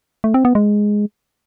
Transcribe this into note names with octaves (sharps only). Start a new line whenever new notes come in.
A3
C4
B3
G#3